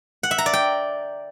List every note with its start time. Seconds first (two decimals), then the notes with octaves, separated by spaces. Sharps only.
0.23 F#5
0.31 E5
0.38 A#5
0.46 D5
0.53 G5